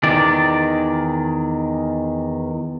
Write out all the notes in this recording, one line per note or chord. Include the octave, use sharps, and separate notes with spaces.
E2 D#3 D5